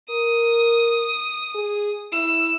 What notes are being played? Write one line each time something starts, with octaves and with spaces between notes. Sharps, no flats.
A#4 D#6
G#4
E4 E6